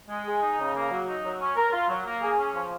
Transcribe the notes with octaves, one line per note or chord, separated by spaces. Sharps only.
G#3
G#4
D#4
C#3
A#3
F#3
D#4
F#3
C#4
A#4
F4
F#3
A#3
G#4
C#4
F3